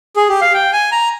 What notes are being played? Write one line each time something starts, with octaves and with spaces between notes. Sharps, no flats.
G#4
G4
F5
G5
G#5
A#5